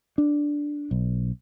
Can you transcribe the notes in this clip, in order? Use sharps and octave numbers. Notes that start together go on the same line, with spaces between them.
D4
B1